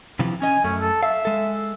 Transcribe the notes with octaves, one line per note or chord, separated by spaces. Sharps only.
C3 E3 F3
C#4 D#5 G#5
F#2 A3 C#4
A4
E5 F5
G#3 A4